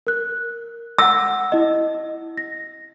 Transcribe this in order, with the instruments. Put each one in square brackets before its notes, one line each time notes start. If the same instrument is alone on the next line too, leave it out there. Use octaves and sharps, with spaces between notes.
[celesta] A#4 F#6
[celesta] F#5 A#6 [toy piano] E6
[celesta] E4 D#5
A#6